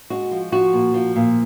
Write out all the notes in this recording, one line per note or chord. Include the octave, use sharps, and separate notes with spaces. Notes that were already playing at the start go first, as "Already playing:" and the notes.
G#3 F#4
F3
F3 F#4
A#2
F3
A#2